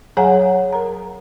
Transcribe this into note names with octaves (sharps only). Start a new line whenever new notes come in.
F#3 G#4 C#5 F#5 G#5 A#5
A#4 A#5